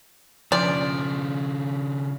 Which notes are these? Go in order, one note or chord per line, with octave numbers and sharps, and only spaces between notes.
C#3 F3 D4 D5